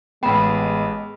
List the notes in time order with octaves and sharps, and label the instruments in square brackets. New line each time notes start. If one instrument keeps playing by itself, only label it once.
[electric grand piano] A1 B3 [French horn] G#3 [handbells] G5 B5